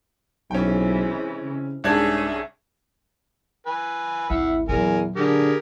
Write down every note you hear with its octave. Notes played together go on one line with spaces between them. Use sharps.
B1 C3 E3 G#3 C#4 G5
C#3
C2 G#2 C#4 D4 G#4 E5 G#6
B4 G#5
G#1 D2 E4 E5 F#5
E2 A#2 F#3 A#4 G#5
D3 G4 G#4 A#4